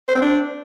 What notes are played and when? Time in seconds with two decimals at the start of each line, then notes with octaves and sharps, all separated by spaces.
0.09 C5
0.15 C4
0.22 D4